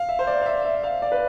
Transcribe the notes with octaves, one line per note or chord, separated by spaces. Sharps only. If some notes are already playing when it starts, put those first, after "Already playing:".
Already playing: F5
E5
C5
D5
F5
E5
E5
F5
D5
B4